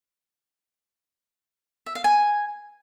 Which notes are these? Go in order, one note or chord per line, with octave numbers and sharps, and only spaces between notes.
E5
F5
G#5